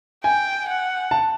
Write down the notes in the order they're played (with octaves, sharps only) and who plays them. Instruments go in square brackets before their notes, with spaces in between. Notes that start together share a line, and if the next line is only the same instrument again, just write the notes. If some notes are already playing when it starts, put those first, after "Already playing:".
[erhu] G5 [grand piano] G#5
[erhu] F#5
[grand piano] A5